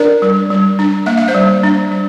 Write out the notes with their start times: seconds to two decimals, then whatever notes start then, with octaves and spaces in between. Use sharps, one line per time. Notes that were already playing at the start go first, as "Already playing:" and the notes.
Already playing: D4 A#4 D5
0.22 G3
0.50 G3
0.79 D4
1.06 A#3 E5
1.17 F5
1.28 C5 E5
1.35 G3
1.63 D4
1.91 G3